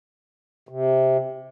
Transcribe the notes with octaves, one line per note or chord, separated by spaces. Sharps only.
C3